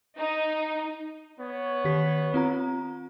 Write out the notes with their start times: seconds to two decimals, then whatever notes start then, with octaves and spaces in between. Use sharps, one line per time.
0.18 D#4
1.40 B3 C#5
1.85 D#3 G4 B6
2.34 C4 F4 A#5